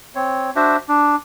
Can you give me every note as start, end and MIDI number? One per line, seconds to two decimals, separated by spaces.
0.15 0.50 60
0.15 0.50 73
0.56 0.77 62
0.56 0.77 66
0.56 0.77 72
0.56 0.77 76
0.88 1.16 62